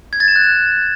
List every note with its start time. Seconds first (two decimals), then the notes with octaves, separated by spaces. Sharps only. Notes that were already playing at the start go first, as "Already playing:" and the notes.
0.13 G#6
0.20 A6
0.28 E7
0.36 F#6
0.43 E7